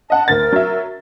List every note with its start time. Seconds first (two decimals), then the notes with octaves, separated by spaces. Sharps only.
0.10 D#5 F#5 A5
0.28 D2 A#4 A6
0.52 F#3 E5